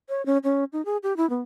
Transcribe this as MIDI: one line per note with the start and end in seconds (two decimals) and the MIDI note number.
0.09 0.24 73
0.26 0.38 61
0.44 0.64 61
0.73 0.83 63
0.85 0.97 68
1.03 1.16 67
1.17 1.28 64
1.30 1.42 59